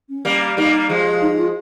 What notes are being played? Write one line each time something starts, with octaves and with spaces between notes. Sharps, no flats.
C#4
G3 A#3
G3 A#3 D#4
F3 G#3
D#4
F4